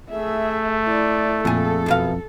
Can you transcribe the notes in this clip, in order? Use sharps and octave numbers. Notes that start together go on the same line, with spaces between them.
A3 G#4 E5
E4 D5
F2 A#2 G#4 A4
F#2 B2 F5